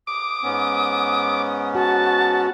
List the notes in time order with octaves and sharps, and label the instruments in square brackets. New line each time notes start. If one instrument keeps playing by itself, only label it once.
[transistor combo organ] D6 [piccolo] D#6
[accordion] G#2 B3 C#4
[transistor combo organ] F#4 [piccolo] A5